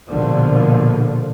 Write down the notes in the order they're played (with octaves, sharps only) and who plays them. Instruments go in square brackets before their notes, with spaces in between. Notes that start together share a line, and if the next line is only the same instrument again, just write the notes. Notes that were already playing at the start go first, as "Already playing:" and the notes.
[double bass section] A#1 B2 D3 F3